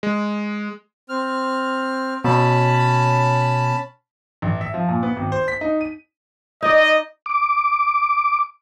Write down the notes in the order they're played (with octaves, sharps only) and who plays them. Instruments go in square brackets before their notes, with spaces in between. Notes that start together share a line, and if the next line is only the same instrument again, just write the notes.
[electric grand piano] G#3
[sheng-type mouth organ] C4 F6
[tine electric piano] B2 [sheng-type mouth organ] C#4 A5 B5
[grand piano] A1
E5
F3
A#2
B3
G#1
C5
B6
D#4
D#7
[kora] D#4 D5 [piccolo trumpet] D#5
[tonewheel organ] D6